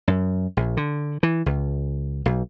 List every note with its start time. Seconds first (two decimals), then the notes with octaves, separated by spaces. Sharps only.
0.08 F#2
0.57 A#1
0.77 D3
1.23 E3
1.46 C#2
2.26 B1